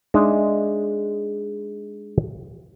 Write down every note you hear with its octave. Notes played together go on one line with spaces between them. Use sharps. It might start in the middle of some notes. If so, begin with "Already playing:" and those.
G#3 D4 D#4 G#4 E5